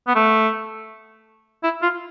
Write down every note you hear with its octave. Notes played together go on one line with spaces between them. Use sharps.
B3
A3
E4
F4